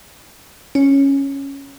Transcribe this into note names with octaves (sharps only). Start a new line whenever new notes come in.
C#4